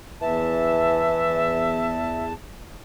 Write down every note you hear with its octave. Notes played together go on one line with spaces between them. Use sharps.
E2 E3 E5 A5